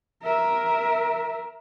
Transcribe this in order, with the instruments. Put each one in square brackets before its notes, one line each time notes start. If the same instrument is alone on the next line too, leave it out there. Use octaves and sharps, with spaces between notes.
[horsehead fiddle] A#4 E5